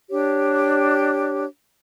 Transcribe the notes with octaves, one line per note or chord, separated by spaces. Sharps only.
D4 G4 C#5